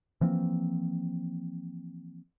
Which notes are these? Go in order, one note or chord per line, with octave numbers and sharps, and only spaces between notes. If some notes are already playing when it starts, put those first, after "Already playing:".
E3 F3 A#3 C4